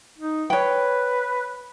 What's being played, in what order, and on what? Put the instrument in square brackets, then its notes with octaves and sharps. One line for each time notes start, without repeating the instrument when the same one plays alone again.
[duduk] D#4
[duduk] B4 [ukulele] C#5 G5